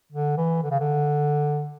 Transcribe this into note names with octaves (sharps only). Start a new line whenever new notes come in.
D3
E3
D3
C#3
D3